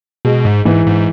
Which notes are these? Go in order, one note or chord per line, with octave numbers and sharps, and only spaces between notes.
B2 G#3
G#2
G#2 E3
G#2